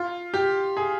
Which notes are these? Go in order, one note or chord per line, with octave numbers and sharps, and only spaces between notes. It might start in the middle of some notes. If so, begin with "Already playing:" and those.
Already playing: F4
G4
G#4